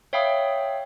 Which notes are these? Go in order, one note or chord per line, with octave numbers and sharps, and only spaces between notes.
C#5 E5 F5 G5 B5 D#6